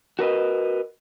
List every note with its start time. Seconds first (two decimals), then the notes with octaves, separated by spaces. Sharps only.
0.19 F#4 A#4 B4 D#5